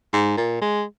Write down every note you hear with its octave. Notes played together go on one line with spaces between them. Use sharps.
G#2
A#2
G#3